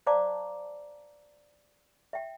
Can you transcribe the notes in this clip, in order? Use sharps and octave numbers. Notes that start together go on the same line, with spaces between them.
C5 D5 F5 A5 A#5 D6
E5 G5